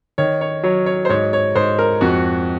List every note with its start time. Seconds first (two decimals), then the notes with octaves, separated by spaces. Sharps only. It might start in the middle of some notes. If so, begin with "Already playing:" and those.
0.18 D#3 C#5
0.41 C#5
0.63 F#3 C#5
0.86 C#5
1.05 C5
1.09 G#2 C#5
1.33 C#5
1.55 G#2 C5
1.79 A#4
2.01 F2 F#4